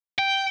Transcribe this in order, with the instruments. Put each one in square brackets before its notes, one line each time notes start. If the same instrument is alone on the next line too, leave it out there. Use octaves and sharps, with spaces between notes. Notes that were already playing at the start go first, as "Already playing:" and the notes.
[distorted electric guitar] G5